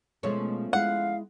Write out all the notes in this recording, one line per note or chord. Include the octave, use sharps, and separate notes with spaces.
B2 F3 G#3 A3 C#4
G#3 E4 F5 F#5